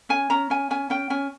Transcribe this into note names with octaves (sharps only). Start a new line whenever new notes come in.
C#4 G#5
C#4 A#5
C#4 G#5
C#4 G#5
C#4 G5
C#4 G#5